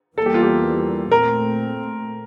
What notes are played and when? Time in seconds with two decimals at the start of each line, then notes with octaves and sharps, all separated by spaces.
0.17 E2 E3 G3 A#3 A4
0.26 G4
0.34 F4
0.43 G4
1.11 A#2 A3 C4 A#4